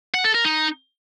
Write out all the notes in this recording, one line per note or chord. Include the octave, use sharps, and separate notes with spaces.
F#5
A4
A#4
D#4